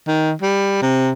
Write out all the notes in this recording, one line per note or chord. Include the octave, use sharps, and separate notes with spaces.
D#3
G3
C3